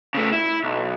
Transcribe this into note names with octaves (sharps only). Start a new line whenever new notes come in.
C#3 A3
E4
B1